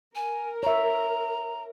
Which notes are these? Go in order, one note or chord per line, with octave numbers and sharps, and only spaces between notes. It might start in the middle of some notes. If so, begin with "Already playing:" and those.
A#4 G#5
C#5 E5 A#5